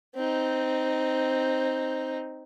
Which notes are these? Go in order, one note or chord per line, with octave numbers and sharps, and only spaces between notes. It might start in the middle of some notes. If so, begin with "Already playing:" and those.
C4 D#4